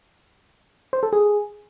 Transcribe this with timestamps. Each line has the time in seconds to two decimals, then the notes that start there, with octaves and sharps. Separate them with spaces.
0.93 C5
1.03 A4
1.13 G#4